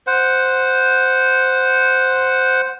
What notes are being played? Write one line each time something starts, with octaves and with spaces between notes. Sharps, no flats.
C5 F#5